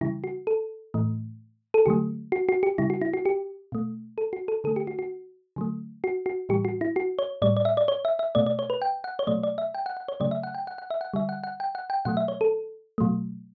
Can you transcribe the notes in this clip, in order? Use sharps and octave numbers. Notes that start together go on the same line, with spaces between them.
C#3 E3 G3 E4
F#4
A4
A2 E3 A3
A4
D3 F#3 A3 G4
F#4
F#4
G4
C#3 G3 E4
F#4
E4
F#4
G4
B2 A3
A4
F#4
A4
D3 A3 A4
G4
F#4
F#4
D3 F#3 A3
F#4
F#4
A2 E3 G3 G4
F#4
E4
F#4
C#5
A2 G3 D5
D5
E5
D5
C#5
E5
E5
B2 A3 D5
D5
C#5
B4
G5
F#5
C#5
B2 F#3 A3 D5
D5
E5
G5
F#5
F#5
C#5
C#3 F#3 A3 D5
E5
F#5
G5
F#5
F#5
E5
F#5
D3 G3 E5
F#5
F#5
G5
F#5
G5
B2 F#3 A3 F#5
E5
C#5
A4
B2 F#3 A3